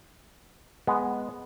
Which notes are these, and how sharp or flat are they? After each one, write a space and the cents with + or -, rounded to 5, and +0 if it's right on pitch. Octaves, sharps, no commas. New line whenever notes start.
G#3 +0 B3 +0